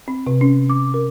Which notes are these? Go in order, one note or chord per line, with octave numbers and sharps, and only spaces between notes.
C4
C3
C#4
D6
A#4